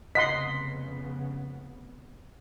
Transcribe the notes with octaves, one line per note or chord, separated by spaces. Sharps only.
F1 C#3 B3 D#5 F#5 C6 B6